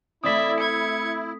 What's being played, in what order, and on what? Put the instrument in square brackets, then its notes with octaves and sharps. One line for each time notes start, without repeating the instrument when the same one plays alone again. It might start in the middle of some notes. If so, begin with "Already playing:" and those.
[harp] A3 C4 [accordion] E4 [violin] D5 E5 [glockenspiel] D#6 B6
[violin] G#6 C#7